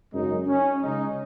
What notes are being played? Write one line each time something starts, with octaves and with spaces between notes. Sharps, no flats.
F#2 C#3 G#3 D#4
C#4
C#2 C#3 G#3 D#4